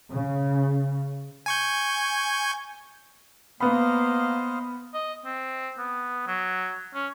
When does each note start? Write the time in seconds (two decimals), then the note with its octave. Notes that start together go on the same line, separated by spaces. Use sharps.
0.13 C#3
1.46 G#5 C#6 G6
3.60 A#3 B3 C5 D#5 F5 B5
4.94 D#5
5.25 C4
5.78 B3
6.28 F#3
6.94 C#4